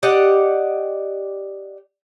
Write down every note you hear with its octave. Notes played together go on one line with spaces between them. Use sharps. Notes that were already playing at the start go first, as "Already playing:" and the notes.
G4 D5 D#5 F#5